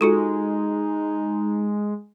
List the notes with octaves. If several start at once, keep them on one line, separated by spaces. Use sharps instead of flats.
G#3 D#4 F4 F#4 A4